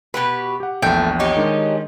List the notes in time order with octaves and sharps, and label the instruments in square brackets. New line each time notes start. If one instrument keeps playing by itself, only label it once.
[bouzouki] B2 G4 B4 [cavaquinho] B5
[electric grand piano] G4 F#5
[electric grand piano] A#1 E2 [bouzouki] A3 [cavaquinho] G5
[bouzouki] C#4 D#4 G4
[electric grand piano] D#3 G#3 D4